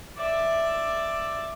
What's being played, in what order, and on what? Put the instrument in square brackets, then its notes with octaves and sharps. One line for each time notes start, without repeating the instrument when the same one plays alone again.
[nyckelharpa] D5 E5